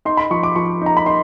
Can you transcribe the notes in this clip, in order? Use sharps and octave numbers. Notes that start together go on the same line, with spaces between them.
D#4 C6
B5
F3 C#6
D6
F3 C#6
D#4 A#5
B5
D#4 C6